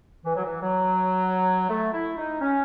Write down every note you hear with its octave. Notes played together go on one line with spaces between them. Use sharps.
E3
F#3
E3
F#3
A3
E4
D#4
C#4